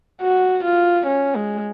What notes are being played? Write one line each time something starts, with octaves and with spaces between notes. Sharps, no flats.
F#4
F4
C#4
G#3